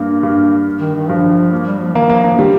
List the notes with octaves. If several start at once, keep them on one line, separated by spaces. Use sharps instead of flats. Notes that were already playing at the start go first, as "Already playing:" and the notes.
Already playing: G2 A#3
G2
D#3
D#3
G2 F3
A#3
G3
F3
D#3 A#3
F3 A#3
F3 A#3
D#3 G3